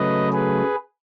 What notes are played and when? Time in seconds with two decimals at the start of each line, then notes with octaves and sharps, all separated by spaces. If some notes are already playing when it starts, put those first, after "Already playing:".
Already playing: C#3 F#3 A3 B4 D#5
0.33 G#4 B4